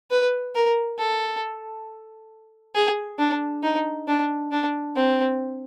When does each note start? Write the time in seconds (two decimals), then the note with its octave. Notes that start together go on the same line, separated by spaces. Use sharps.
0.11 B4
0.55 A#4
0.99 A4
2.75 G#4
3.19 D4
3.63 D#4
4.08 D4
4.52 D4
4.96 C4